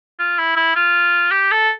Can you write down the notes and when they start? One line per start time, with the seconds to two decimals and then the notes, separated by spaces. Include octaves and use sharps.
0.19 F4
0.38 E4
0.56 E4
0.76 F4
1.31 G4
1.51 A4